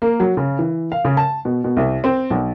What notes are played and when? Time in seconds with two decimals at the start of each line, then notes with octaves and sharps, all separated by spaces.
0.02 A#3
0.20 F#3
0.37 C#3
0.59 E3
0.92 F5
1.05 C#3
1.17 A5
1.45 B2
1.64 B2
1.77 C2
2.04 C4
2.30 B1